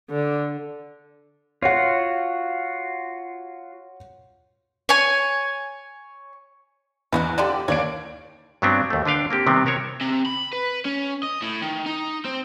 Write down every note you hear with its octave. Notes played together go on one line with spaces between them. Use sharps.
D3
F4 F#4 C#5 F#5
C#5 G#5
E2 B2 C4 F#4
D3 F3 D4 G4 D5
D#2 C#5 D5 D7
G2 F#3 B3 C4 D4
D#2 A3
D3 D4 B4 F5 G5
A#3 C4 G4
C3 D#3 G3 B3 C4
B3 A#4 C5 C#5
C3
B5
B4
C#4
D#5
A2
D#3
D#4
C4